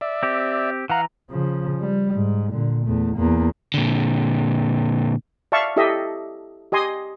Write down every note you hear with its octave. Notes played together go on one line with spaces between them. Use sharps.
D5 E5
C4 G4
E3 F5 F#5 A#5
C#3 F3
G3
G#2
A#2 D3
E2 A3
E2 A#3
A#2 D3
D5 E5 F5 A5 C#6
E4 G4 A4 D#5 E5
G4 D#5 G#5 C6 D#6